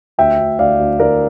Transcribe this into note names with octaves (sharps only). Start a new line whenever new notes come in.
D2 E5 G5
D2
D2 D5 F5
D2
D2 A#4 D5